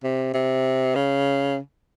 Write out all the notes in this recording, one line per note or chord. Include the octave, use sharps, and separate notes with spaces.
C3
C3
C#3